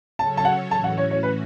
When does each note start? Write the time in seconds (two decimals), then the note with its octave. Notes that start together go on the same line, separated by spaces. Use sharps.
0.19 C#3 F#3 C#4 A4 C#5 A5
0.37 A5
0.45 F#5
0.71 A2 E3 C#4 F#4 A5
0.84 F#5
0.98 C#5
1.11 C#5
1.23 B4